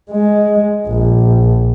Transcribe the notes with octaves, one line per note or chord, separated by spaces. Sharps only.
G#3
A#1